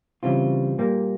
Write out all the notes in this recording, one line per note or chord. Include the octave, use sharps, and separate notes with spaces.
C#3 E3 G3 C4 F4
A#2 G3 A#3